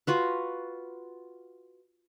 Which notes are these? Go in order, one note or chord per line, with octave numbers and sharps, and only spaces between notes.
F4 F#4 B4